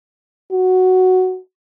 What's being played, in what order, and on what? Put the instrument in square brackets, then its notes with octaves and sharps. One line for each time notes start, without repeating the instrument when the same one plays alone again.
[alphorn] F#4